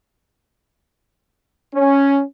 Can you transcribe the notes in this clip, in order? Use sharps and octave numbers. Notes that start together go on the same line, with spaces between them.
C#4